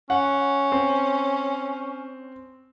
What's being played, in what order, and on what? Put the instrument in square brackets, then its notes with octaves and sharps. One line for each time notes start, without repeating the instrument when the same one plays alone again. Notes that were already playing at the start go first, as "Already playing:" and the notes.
[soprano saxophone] C#4 [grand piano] F#5
[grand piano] C4